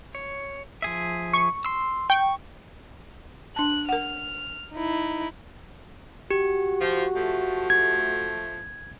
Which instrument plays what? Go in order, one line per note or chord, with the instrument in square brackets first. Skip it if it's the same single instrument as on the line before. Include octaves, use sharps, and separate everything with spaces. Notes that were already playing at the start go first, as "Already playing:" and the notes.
[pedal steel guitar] C#5
F3 G#4 E5
[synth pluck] C#6
[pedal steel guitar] C6 E6
[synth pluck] G5 [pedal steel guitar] C#6
[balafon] D4 A5 [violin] F#6
[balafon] A#4 F#5 [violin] F6
[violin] D#4 E4
[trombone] F#4 [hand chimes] G4
[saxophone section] F3
F3 A3
[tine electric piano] G#6